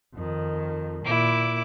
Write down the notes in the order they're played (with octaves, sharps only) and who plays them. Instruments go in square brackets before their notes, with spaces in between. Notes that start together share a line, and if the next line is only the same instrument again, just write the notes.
[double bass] F2 D#3
[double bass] A#2 [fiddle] E4 D6